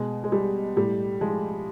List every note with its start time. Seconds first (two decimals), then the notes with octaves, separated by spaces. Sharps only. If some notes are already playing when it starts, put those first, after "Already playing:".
Already playing: B2 G#3
0.24 G#3
0.32 G3
0.77 A2 G3
1.21 F3 G#3